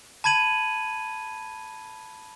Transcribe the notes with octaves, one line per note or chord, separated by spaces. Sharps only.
A5 B5 G#6 D#7 F#7